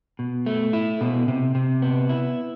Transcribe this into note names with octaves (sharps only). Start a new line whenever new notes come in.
B2
A3
E4
B2
C3
C3
B3
E4